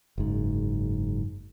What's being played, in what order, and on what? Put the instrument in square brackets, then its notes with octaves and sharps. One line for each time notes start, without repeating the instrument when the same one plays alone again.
[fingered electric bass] F#1 G#2